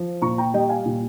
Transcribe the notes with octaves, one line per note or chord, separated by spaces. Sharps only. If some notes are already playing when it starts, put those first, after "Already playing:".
Already playing: F3
A#2 A#5 C#6
G5 A#5
G3 D#5 G5
F5 G#5
A#2